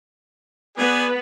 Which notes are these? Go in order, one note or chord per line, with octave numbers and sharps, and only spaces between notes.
B3 G#4 B4 D5 G#5